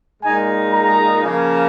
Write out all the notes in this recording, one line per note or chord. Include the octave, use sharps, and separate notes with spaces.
A#2 G#3 D#4 G#5
A#5
C#3 F3 A#3 C#4